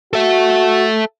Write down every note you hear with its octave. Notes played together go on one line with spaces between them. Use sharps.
F#4 A4 E5